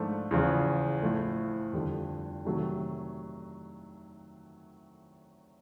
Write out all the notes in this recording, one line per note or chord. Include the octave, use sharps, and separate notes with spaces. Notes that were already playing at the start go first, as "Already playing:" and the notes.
Already playing: G#2 F3 A3 D4
E2 C#3 F3
A2 F3 A3
F2 D3 G3
C3 D#3 F#3 A3